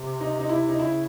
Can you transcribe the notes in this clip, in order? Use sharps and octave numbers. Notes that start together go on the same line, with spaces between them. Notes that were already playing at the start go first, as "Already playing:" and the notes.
Already playing: C3
D#4
D#4
E4
D#4
C#3 E4